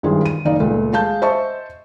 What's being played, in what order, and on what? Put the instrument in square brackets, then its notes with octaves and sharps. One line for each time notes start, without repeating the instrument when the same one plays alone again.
[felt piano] G#1 G2 D#3 E3 F4 G#4
D#7
F#1 D#4 D5 F5
C#2 A#2 A3
G#3 F5 A5 G6
C5 D#5 E5 A5 C#6